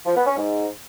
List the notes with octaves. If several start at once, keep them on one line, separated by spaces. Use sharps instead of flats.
F3
B3
C#4
G#2